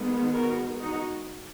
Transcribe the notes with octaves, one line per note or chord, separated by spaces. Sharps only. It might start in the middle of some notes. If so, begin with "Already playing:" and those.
Already playing: D#3 G#3 B3
F#4 A#4
D#4 F#4